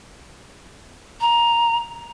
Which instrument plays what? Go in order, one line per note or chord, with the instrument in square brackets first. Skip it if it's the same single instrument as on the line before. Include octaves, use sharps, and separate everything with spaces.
[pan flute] A#5